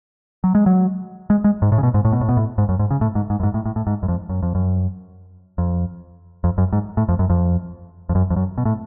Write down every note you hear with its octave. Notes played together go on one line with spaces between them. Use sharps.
F#3
G#3
F#3
G#3
G#3
G#2
A2
C#3
B2
G#2
A2
B2
A2
B2
A2
G#2
F#2
G#2
C#3
A2
G#2
G#2
F#2
G#2
A2
A2
A2
G#2
F#2
F2
F#2
F2
F#2
F2
F2
F#2
G#2
A2
F2
F#2
F2
F2
F#2
F2
F#2
B2
A2